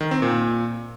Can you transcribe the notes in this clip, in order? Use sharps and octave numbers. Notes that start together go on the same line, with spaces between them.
D#3
C4
A#2